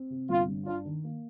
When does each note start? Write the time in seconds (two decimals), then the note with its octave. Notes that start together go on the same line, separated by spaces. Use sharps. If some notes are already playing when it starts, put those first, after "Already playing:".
Already playing: C4
0.10 C3
0.29 G1 F4
0.48 G2
0.66 D4 F4
0.85 D#3
1.04 A#3